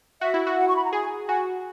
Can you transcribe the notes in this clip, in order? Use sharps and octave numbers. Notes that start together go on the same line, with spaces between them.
F#4 E5
E4
F#4
F#5
C#6
B5
A#5
G#4 G#5
F#4 G#5